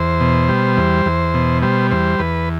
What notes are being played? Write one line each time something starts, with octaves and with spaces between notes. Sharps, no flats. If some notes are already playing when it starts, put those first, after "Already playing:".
Already playing: E2 C5
B2
G3
E2
E2
B2
G3 C5
E2 C5
E2 B4